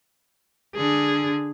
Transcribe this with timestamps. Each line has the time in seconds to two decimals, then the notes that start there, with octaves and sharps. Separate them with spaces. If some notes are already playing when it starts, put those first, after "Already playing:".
0.76 D3 G#4